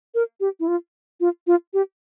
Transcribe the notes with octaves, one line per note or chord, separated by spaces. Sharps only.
A#4
G4
E4
F4
F4
F4
G4